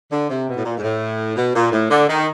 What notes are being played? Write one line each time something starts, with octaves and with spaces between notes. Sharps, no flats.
D3
C3
B2
A2
A#2
G#2
A2
B2
A#2
A2
D3
D#3